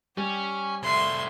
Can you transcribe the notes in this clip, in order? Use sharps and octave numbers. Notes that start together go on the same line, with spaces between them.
G3 C#4 G4
C2 A2 E5 C6